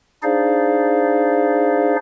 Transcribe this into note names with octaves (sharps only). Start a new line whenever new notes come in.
D4 D#4 G#4 C5 D5 F5